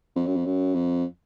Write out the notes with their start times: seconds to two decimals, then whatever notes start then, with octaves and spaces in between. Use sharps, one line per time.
0.16 F2
0.26 F#2
0.35 F2
0.45 F#2
0.74 F2